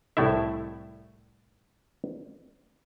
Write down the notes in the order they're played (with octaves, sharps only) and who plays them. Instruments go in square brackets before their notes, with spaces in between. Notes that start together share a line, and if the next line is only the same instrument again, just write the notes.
[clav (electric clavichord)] C2 A2 A3 E4 E5